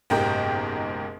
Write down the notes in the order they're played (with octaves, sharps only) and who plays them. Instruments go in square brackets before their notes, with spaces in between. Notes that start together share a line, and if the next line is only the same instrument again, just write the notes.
[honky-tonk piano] F#1 B1 G#2 G4 A#4 G5